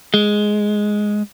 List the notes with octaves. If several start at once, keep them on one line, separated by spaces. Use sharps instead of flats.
G#3